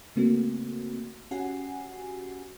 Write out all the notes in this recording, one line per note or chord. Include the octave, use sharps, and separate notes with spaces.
C#3 A3 A#3 C4 F#4
C#4 F#4 G4 F#5 G#5 C7